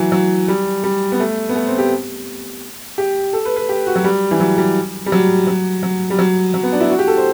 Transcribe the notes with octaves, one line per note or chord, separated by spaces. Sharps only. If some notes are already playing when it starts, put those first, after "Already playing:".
Already playing: E3 F#3
F#3
G3
G3
B3
A3
B3
A3
C4
G4
G4
A4
B4
B4
G4
F#4
F#3
G3
E3
F#3
G3
G3
F#3
F#3
F#3
G3
F#3
F#3
B3
D4
E4
F#4
G4
A4
C5